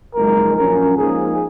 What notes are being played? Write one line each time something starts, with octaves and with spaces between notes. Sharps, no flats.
F#1 F2 F3 G#3 D#4 A#4
A#1 A#2 F#3 C#4 A#4
G#2 F3 A#3 D#4 G#4